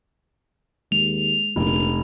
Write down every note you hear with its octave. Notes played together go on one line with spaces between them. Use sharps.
D#2 G#3 F7
F1 A#1